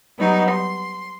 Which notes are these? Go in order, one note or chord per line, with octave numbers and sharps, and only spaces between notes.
F#3 G3 B3 D#4
C6